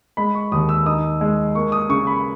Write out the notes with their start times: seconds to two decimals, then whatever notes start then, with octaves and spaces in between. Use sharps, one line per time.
0.17 G#3 B5
0.35 C#6
0.52 D#2 D#6
0.69 E6
0.86 D#4 D#6
1.21 G#3
1.55 A#3 C#6
1.72 D#6
1.89 C#3 C#6
2.07 B5